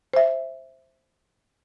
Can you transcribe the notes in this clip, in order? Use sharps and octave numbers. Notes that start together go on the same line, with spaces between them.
C5 E5